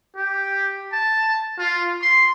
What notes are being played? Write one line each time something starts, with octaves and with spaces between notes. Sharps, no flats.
G4
A5
F4
C6